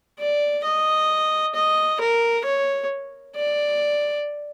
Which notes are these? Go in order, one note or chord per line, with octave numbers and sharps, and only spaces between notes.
D5
D#5
D#5
A#4
C#5
D5